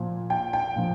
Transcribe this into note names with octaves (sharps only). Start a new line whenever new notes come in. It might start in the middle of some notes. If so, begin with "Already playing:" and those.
Already playing: A#2 F3
G5
G5
A#2 F3